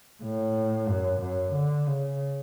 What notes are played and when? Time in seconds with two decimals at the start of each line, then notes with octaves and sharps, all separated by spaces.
0.23 A2
0.88 F#2
1.21 F#2
1.54 D3
1.87 C#3